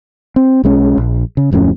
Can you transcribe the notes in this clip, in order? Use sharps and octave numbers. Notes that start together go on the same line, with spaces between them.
C4
B1 G#3 C#4
A#1
C#3
D1 F2 A2 C#4